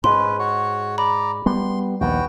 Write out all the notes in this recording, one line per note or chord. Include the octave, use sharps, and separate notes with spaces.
G#2 C#4 B4 C6
F#4 C#5
D5 A#5 B5
G3 B3 C6
A#1 D#2 B3 F#4 G5